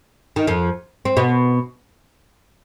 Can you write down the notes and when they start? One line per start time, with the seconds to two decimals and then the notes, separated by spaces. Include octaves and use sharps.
0.36 D#3
0.47 F2 F3
1.05 C4
1.17 B2 B3